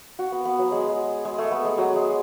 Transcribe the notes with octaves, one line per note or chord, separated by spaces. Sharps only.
F#4
B3
B3
F#3
G#3
G#3
G#3
A3
B3
G#3
F#3
G#3